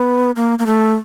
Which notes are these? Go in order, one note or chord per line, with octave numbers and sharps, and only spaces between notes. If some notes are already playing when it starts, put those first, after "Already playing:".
Already playing: B3
A#3
A#3
A3